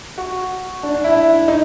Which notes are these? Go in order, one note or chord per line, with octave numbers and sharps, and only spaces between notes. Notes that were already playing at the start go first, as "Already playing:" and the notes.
F#4
D4
D4
E4
E4
D#4